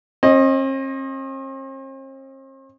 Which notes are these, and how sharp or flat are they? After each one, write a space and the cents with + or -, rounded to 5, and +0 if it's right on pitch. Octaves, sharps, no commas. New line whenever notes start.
C4 +45 D#5 +0